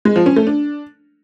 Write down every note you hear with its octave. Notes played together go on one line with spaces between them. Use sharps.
G#3
F3
C#4
A3
D4